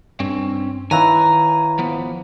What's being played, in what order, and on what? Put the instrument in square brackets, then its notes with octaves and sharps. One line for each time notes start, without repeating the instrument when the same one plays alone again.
[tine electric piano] G2 [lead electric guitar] C4 C#4
[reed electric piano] D#3 F5 E6 [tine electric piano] E4 B4 C#5 [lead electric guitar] G#5 [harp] A#5
[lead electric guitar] F3 B3